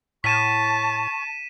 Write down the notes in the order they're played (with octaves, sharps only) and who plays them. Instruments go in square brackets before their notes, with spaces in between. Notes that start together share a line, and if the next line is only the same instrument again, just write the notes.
[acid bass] A2 [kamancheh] A5 [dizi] C#6 [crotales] B6 D#7 E7